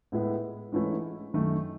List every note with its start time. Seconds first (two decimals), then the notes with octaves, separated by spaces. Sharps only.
0.12 A2 G#3 B3 E4
0.72 G#2 E3 A3 C#4 E4
1.34 F#2 D#3 A3